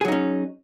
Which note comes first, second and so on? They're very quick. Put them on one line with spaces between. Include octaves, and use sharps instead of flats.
G#4 F#3 D#4 C#4